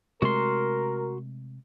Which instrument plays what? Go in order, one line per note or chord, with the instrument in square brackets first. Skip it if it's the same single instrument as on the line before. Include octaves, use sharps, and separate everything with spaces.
[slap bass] C3 G#3 A3 [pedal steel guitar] F#4 C6 [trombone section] A#4